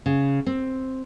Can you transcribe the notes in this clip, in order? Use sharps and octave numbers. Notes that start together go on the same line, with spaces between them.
C#3
C4